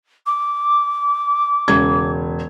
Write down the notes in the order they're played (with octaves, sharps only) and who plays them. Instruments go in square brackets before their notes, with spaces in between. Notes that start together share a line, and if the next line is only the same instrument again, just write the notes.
[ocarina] D6
[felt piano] E1 C#3 G#6